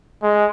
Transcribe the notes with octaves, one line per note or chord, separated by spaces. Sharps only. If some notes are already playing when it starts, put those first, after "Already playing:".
G#3